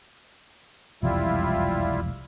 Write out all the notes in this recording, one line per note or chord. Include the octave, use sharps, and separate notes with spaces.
E1 C2 F2 G3 E4 F4